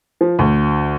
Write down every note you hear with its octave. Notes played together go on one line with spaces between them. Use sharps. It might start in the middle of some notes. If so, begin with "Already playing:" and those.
F3
D2